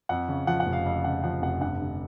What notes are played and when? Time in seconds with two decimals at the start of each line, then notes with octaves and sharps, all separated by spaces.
0.09 F2 F#5
0.28 C#3
0.47 F3 F#5
0.60 F#5
0.66 F1
0.73 F5
0.85 F2 F5
1.04 C#3 F#5
1.24 F3 F#5
1.42 F1 F#5
1.61 G2 F#5
1.81 D3